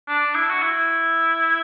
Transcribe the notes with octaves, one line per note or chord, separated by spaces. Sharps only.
D4
E4
F#4
E4